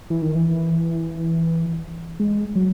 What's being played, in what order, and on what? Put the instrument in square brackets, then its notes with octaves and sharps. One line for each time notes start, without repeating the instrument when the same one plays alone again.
[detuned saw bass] E3
D#3
E3
G#3
F#3